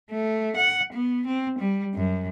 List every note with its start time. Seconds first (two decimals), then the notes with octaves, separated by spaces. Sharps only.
0.10 A3
0.56 F#5
0.92 B3
1.26 C4
1.58 G3
1.95 F#2